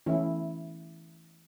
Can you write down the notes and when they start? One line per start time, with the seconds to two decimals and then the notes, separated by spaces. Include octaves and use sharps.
0.06 E3 A3 C#4 E4